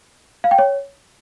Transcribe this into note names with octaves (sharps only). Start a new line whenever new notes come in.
F5
G5
C#5